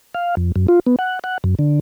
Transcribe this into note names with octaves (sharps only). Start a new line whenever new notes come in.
F5
F2
F#2
F4
B3
F#5
F#5
F#2
D3